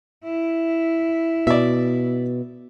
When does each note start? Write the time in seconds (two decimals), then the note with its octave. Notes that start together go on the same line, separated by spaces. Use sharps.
0.25 E4
1.47 B2 D5 E5